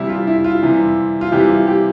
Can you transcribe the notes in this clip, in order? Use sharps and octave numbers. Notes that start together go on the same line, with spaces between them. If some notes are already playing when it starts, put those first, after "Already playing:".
Already playing: C3 E3 G3 E4
F4
E4
F4
C3 E3 G3
F4
C3 E3 G3 G4
F4
G4